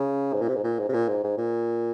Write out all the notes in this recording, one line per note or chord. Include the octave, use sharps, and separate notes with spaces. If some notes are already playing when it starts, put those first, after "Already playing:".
Already playing: C#3
G#2
A#2
C3
G#2
A#2
G#2
C3
A#2
G#2
G#2
A#2